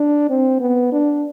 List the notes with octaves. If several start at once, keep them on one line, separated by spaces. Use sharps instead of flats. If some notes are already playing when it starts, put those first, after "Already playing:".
Already playing: D4
C4
B3
D4